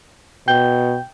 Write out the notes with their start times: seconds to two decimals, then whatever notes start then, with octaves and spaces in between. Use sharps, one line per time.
0.48 B2 G5 G6 G7